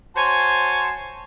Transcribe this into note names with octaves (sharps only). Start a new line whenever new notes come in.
F#4 C5 C#5 G#5 A5